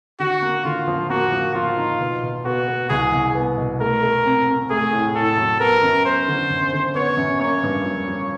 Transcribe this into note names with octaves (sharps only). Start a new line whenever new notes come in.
D3 F#4
A#3
D3 F4
F3
A#3 F#4
F3
F3 F4
D#4
B2
B2
B3 F#4
B3
C2 G#4
C2
B3
B2
A3 A#4
A3
C4
C4
A3 G#4
A2
A2 A4
F#3
B3 A#4
F#2
B3 C5
D3
F#2
D3
B3 C#5
F#2
A#3 C#5
G2
F3
F3